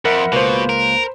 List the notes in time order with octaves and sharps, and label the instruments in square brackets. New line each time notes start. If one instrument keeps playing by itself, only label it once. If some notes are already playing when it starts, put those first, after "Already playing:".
[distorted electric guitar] F2 [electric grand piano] A#4 [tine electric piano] E5 F#5 B5
[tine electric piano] C#2 A#3 [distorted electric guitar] B2 [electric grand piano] B4 C5
[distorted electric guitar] A#4